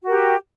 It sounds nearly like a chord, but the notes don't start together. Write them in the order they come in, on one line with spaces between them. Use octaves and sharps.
F#4 A#4 G4